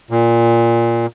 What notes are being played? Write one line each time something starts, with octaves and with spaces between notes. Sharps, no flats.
A#2